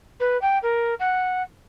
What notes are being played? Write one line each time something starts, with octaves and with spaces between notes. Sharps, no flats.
B4
G5
A#4
F#5